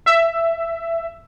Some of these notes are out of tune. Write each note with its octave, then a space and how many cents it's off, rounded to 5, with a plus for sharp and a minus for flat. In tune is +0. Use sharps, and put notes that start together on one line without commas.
E5 +10